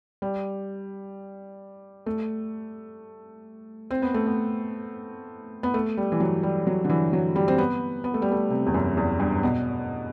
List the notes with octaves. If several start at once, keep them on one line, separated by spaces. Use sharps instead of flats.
G3
A3
C4
B3
A3
B3
B3
A3
G3
E3
F#3
G3
F#3
D3
E3
F#3
G3
C4
B3
B3
A3
G3
A3
C3
E2
F#2
E2
G2
B2